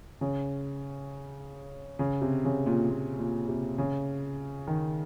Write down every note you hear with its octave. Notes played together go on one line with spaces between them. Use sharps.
C#3
C#3
C3
C#3
A#2
A#2
A#2
C3
C#3
D#3